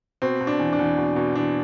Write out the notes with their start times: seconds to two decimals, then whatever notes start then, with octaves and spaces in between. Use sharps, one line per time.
0.22 B2 C4
0.41 B2
0.47 D4
0.59 E2
0.73 D4
0.79 E2
0.98 B2
1.16 B2
1.35 E2 D4